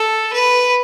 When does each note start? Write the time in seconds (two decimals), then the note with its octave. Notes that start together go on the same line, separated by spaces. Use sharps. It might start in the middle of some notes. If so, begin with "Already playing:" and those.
Already playing: A4
0.33 B4